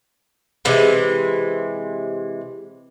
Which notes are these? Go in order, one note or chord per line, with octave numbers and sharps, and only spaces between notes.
C3 E3 G#3